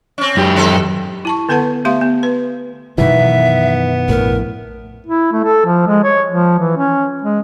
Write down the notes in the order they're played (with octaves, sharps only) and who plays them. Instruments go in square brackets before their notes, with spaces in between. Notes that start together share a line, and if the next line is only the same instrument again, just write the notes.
[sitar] C4 C#4
[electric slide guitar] F#2 G4
[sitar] D#3 C4 A4
[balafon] E4 A5 C#6
D3 B3 A4 B4 F#5 A5
A3 B3 G4 E5 F5 C6
B3
B4
[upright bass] F#2 B2 [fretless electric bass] D#3 E3 [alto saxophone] B3 [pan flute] E5
[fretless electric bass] A#1 A2 [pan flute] A#4
[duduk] E4
A3
A4
F3
G#3
C#5
F3
E3
C#4
G#3